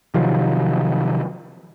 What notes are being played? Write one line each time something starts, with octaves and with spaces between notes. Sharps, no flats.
C3 D#3 F3 F#3